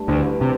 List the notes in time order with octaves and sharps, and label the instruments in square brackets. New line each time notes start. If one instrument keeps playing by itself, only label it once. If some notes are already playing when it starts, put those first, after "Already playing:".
Already playing: [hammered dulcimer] G2 A3
[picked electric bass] D2 D3 [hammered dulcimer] E3
[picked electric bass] C3